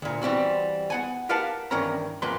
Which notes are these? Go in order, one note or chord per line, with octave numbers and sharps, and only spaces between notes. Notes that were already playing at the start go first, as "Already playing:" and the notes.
D2 A#2
E3 G3 C4 F#4
B3 F#5 G#5
G4 A#4 B4 F5 F#5 A5
G2 D#3 E3 C#4 A#4 A#5
F#2 A#2 F3 A#3 B4 C6